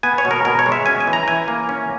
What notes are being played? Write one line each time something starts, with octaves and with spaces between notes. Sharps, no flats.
B3 G#5
C#5
B2
A#4
B2 A#4
C#5
G#3
E5
C#4 G#5
G#5
E3
A#5
E3 G#5
A#3
C#4